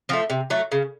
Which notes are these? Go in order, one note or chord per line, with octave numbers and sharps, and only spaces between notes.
F3 A3 C4
C3
F#3 A3
C#3